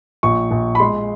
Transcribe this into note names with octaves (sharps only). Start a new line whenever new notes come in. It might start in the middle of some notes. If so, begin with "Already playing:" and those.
A#1 C#6
A#1
B5
G#3 C6